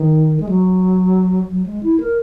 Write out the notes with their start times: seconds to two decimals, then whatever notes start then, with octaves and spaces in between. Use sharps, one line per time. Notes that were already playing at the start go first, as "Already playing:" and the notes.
Already playing: D#3
0.40 G#3
0.49 F#3
1.50 F#3
1.66 G#3
1.83 E4
2.00 A#4